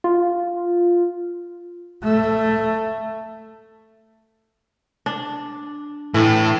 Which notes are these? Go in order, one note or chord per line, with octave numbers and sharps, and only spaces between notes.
F4
A3
D4
A2 E3 A3